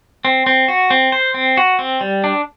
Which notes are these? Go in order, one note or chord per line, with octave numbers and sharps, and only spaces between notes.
C4
C4
F#4
C4
C5
C4
F#4
C4
G3
D4